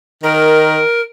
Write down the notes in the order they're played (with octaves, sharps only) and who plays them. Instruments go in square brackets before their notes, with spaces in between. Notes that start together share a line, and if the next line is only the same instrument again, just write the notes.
[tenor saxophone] D#3 [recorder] A#4